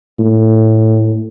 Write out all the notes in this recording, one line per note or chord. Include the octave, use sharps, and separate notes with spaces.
A2